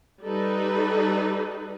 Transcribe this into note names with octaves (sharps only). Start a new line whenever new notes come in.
G3 D#4 A4 B4